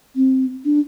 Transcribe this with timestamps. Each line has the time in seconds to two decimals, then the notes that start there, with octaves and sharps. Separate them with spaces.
0.16 C4
0.65 D4